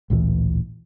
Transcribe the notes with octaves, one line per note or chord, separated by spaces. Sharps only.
A1 D2 A#2 E3